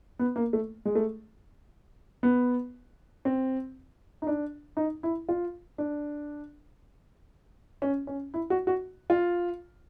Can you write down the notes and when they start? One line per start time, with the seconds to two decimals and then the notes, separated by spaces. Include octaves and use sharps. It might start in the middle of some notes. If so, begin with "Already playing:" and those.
0.19 B3
0.36 A#3
0.53 A3
0.85 G#3
0.95 A3
2.23 B3
3.25 C4
4.22 D#4
4.27 D4
4.77 D#4
5.03 E4
5.29 F4
5.78 D4
7.82 C#4
8.07 C#4
8.34 E4
8.50 F#4
8.67 F#4
9.10 F4